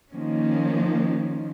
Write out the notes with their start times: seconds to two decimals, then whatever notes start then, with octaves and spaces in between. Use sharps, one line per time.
0.12 D#3 F3 A#3 C#4